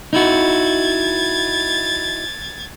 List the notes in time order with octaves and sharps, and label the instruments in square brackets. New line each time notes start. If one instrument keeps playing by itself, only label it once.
[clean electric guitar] D#4 E4 F#4 [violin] G#6 A6